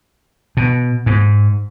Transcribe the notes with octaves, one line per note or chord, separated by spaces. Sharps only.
B2
G#2